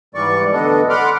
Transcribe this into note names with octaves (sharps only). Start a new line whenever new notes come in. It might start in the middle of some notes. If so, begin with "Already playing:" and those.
G#2 E3 G3 D5 C#6
D2 B3 D4 A4 D#5
F#5 B5 C6 D6 F6